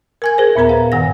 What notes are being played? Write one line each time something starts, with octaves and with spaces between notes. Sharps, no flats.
A#4 G#5 G#6
G#4 A#4 C5
D#2 A#2 B3 A#4 A#5
B4 F5
G2 D#3 F#5 A#6